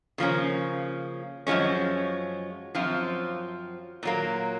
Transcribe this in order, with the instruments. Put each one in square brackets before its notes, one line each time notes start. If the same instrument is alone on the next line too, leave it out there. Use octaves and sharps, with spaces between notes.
[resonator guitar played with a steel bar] C#3 F3 A#3 C#4
F#2 F3 G#3 C#4
F#2 F3 C4 F4
A#2 F#3 A#3